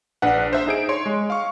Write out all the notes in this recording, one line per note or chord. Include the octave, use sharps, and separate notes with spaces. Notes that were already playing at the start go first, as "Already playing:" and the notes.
A#1 D4 B4 F#5
C5 E5
D#4 G#4 D7
C#5 C6
G#3
F5 C#6